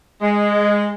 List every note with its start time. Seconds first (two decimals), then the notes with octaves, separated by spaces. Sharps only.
0.22 G#3